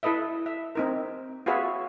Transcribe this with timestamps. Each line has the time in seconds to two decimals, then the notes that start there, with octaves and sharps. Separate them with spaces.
0.03 E4 A4 B4 D#5 E5
0.46 E5
0.75 C4 D#4 A#4
1.46 F4 F#4 G#4 B4 C#5 E5